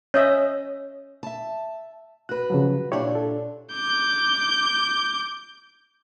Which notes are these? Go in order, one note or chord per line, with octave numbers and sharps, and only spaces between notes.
C#4 C#5 D#5 E5
E5 A5
F#4 B4 F#6
C#3 F3 F#3
A#2 D4 E4 G4 C#5
A4
D6 G6